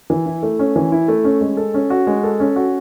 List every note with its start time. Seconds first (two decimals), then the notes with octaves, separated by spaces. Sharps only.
0.10 E3
0.26 E4
0.43 A3
0.59 C#4
0.76 E3
0.92 E4
1.08 A3
1.24 C#4
1.41 G#3
1.57 A4
1.74 C#4
1.90 F#4
2.07 G#3
2.23 A4
2.40 C#4
2.56 F#4